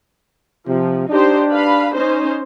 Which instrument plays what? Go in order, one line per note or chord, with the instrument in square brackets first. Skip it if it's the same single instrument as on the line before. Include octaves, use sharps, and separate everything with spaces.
[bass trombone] C3 [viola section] F3
[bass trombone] D4 [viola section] D#4 G4 C5
[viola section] B4 F5 B5
C#4 D#4 C5